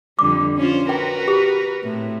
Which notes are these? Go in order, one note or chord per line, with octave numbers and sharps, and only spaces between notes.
F2 D3 G3 D6
C#4 F4 C5
F#4 A#4 B4 G5
G4
A2 C4